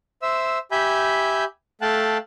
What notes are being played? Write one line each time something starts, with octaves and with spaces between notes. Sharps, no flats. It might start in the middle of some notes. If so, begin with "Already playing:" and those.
C5 E5 E6
G4 E5 G#5 B5 G6
A3 F5 G5 A5 F#6